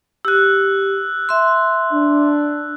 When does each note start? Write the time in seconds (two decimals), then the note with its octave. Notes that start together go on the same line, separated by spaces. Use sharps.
0.25 G4 E6 F#6
1.29 E5 C6
1.92 D4